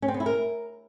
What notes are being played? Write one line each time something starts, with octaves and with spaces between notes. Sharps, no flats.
C#4
C4
B3
E4
A#4